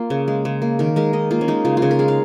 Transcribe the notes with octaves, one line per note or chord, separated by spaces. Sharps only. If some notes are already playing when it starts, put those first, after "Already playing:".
Already playing: A#3 F4
C#3
G#3
C#3
A#3
D#3 A#4
G#3 A#4
D#3 D#5
A#3 F4
C#4
G#3 D#4
C#3 F4
F4
C#3 G#4
A#4
G#3 G#4
F5